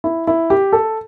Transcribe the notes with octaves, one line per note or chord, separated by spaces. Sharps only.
E4
E4
G4
A4